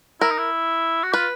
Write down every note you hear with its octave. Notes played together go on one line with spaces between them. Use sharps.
E4 A#4
D#4
E4
F#4
F4 B4